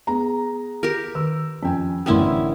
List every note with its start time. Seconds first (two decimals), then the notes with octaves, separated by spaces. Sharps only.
0.07 B3 G#4 A#5
0.83 G4 A#4
1.15 D#3 E6
1.63 F2 C#4 G5 G#5
2.06 A1 D3 B3 C#4 E4 A#4 G5 C6